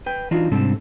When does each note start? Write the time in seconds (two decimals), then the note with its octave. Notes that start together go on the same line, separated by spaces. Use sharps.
0.06 B4 G5
0.31 E3 D4 D#4 F4 F#4
0.51 G#2 C3 G3 C4 D4 A4